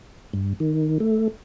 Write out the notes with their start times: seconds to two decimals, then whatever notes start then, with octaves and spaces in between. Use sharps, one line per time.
0.33 G2
0.60 D#3
1.00 A3